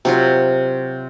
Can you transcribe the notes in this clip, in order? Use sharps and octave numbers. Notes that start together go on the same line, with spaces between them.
C3 F#3 F4